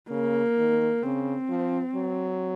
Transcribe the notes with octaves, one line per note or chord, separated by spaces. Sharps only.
C#3 A#3
D#3
C#3 C4
F3
F#3